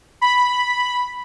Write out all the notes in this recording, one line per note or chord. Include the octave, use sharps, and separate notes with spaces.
B5